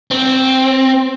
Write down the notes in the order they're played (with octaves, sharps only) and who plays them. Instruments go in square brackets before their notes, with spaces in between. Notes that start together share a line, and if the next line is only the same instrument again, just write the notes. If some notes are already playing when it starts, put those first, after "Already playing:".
[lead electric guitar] C4